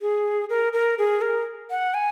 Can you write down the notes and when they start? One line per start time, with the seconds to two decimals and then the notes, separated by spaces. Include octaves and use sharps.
0.01 G#4
0.50 A#4
0.73 A#4
0.98 G#4
1.21 A#4
1.70 F#5
1.94 G#5